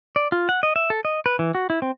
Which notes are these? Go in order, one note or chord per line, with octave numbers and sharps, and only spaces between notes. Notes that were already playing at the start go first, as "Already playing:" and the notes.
D5
F4
F#5
D#5
E5
A4
D#5
B4
E3
F#4
E4
C4